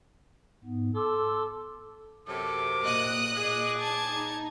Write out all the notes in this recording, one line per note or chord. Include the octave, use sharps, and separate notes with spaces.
G#2 B3
A4 C6 D6 E6
F#2 C3 A4 D6
A#2 D#5 D#6 F#6
G#4 D6
A5 G#6
D#4